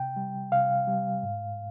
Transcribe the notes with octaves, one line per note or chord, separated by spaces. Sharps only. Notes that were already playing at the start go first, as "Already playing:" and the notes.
Already playing: C3 G5
G3
C3 F5
G3
G#2